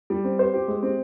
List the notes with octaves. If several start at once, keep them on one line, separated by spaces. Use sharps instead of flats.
G3
C4
C5
G4
G#3
C4